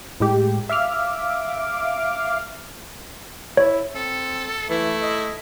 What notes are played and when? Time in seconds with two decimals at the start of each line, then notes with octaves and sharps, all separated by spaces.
0.20 A2 G#3 G4
0.69 E5 F5 D6 F6
3.57 E4 C#5
3.95 C4 A4
4.70 E3 A3 E4
5.02 D#5